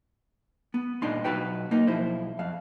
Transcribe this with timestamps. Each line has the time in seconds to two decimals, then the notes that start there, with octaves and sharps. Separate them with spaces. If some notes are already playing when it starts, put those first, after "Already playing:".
0.74 B3
1.02 G2 A#2 D4 D#4 C6
1.24 B1 F4 F#4 B4 G5
1.71 A#3 D#4
1.87 B1 F3 E4 C5
2.39 F2 F5